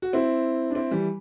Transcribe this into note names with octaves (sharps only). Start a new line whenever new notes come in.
F#4
C4 E4
D4
C4 E4
E3 G3